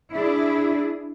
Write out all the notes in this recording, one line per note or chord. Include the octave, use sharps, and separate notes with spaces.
D4 E4 G#4